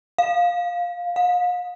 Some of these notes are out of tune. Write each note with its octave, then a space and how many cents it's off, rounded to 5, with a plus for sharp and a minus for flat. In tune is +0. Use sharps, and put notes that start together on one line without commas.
F5 +10
F5 +40